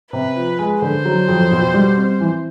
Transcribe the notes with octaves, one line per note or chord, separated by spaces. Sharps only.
C3 B4
F3
G#3
D3 C5
F#3
F2
B2
G3
C4
E3